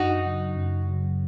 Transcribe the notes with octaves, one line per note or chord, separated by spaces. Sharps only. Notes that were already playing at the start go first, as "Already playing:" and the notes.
Already playing: F#2 D#4 F#4
C#3 F#3
F#2
C#3 F#3